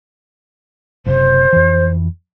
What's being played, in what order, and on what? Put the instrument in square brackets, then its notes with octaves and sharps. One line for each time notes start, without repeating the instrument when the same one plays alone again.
[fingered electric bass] F#1 C3 [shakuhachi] C5
[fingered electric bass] F2 E3